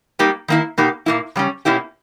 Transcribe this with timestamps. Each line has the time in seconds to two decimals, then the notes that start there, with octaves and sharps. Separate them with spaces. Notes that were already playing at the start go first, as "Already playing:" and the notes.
0.19 G3 A#3 D#4 G4
0.48 D#3 A#3 E4
0.78 B2 A#3 D#4 G4
1.06 A#2 A#3 E4
1.36 C#3 G3 C#4
1.65 B2 A#3 C#4 E4 G4